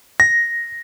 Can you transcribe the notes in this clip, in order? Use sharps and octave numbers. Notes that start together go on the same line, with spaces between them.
A#6